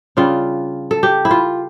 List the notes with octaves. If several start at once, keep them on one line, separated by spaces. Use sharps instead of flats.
C#3 G3 D4 F4
A4
G4
E4
F4